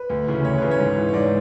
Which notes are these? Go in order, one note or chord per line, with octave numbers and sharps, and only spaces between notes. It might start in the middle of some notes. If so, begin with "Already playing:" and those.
Already playing: B4
D2
C#3 E3
D2 C#5
C#3 E3 B4
C#5
G#2
E3
C#5
G#2 D5